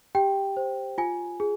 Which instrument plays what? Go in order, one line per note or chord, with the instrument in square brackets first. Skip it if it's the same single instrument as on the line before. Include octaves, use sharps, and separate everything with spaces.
[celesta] G4 G5
C5
F4 G#5
G#4